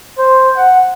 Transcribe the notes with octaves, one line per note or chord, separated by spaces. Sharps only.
C5
F#5